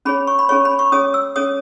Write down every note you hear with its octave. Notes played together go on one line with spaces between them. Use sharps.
C#4 G#4 C#5 B5
C#6
B5
C#4 G#4 C#5 C#6
B5
C#6
C#4 G#4 C#5 D#6
E6
C#4 G#4 C#5 D#6